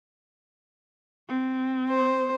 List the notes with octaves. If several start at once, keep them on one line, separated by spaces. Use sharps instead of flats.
C4
C5